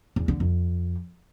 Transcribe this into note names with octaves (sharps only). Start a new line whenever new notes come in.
E2
D3
F2